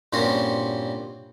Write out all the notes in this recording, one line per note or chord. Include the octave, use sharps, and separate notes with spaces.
G2 A#2 C4 C#4 F#4 C5